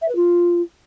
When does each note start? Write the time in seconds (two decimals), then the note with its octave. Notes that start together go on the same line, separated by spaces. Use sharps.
0.01 E5
0.08 B4
0.15 F4